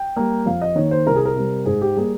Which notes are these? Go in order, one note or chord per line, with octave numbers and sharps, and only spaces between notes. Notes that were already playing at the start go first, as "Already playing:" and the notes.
Already playing: G5
G3 A#3
F2 F5
D#5
D#3 A#3 C#5
C5
C2 A#4
G#4
A#4
C3 G3
G#2 G#4
G4
G3 A#3 G#4